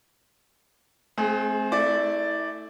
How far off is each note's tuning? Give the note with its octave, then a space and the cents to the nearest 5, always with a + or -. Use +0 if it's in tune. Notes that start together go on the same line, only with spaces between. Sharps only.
A3 -45 C4 +5 G#4 +15
A3 +5 E4 -30 D5 +0